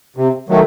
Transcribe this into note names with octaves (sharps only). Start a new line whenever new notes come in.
C3
D#3 F#3 A3